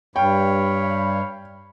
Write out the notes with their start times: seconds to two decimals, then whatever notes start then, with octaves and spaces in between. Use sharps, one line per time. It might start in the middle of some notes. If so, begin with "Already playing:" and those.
0.16 G2 C#5 F5 G5 B5